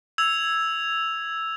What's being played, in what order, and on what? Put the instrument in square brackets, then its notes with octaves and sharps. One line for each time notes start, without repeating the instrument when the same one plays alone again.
[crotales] E6 G#6 F7